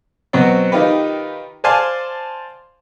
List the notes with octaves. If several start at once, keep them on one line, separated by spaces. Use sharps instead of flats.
B2 F#3 B3 C4
D#3 D#4 F4 G4 B4
C5 D5 F5 G#5 A5 C6